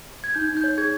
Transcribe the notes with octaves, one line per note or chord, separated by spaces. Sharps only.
G#6
D#4 G6
D#4
G6
C#5
G#4 G#6